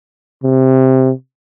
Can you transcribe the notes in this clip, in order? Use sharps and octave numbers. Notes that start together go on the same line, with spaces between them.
C3